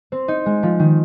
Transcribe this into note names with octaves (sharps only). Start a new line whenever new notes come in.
C4
D#4
G#3
F3
D#3